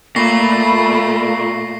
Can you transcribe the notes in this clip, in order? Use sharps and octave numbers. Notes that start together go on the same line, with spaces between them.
A#2 A3 B5 C#6 A#6 C7